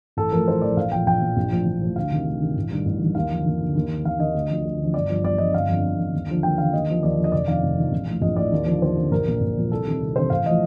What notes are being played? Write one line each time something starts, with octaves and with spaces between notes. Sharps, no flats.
A1 A4
A2 F3 A#4
A1 C5
A2 F3 D5
A#1 F5
A#2 F3 G5
A#1 G5
A#2 F3
A#1
A2 F3
A#1
A2 F3
D2 F5
C3 D#3
D2
C3 D#3
A1
G2 D#3
A1
G2 D#3
D#2 F5
D3 F3
D#2
D3 F3
D#2
D#3
D#2 F5
D#3 D#5
D2
D3 F3
D2
D3 F3
G1 D5
G2 F3
G1 D5
G2 F3 D#5
G1 F5
F2 D3
G1
F2 D3
D#2
D3 F3
D#2 G5
D3 F3 F5
D#2 D#5
D3 F3
D#2 D5
D3 F3
D#5
F1 D5
F2 D#3 F5
F1
F2 D#3
A#1
A2 F3
A#1 D#5
A2 F3 D5
D#2
D3 F3
D#2 C5
D3 F3
A#1 A#4
A#2 F3
A#1
A#2 F3
C2 A4
C3 D#3
C2
C3 D#3 C5
A1 F5
A2 F3 D#5